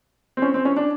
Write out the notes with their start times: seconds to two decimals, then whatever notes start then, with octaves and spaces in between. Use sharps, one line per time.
0.37 C4
0.42 C#4
0.54 C4
0.65 C#4
0.76 D4